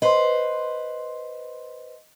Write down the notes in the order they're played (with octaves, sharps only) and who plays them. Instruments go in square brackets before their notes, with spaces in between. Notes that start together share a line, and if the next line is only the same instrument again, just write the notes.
[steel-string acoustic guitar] B4 C5 [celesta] D#5 C6